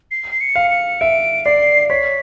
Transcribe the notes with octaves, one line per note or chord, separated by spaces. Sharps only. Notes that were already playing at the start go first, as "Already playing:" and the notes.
C7
C7
C#7
F5
C#7
E5 D7
D5 C7
C#5 B6